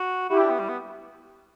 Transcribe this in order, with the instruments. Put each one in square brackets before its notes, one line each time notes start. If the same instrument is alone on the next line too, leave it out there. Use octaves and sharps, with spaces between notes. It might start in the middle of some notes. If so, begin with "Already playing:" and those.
Already playing: [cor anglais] F#4
[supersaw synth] E4 G4 [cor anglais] F#4
[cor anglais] D4
B3
G3
B3